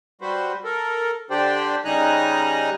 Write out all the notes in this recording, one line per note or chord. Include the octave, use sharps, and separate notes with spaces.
G3 F#4 B4 C5
A4 A#4
D3 D4 G4 C5 D5 G5
C#3 G3 D#4 G#5 A#5 F#6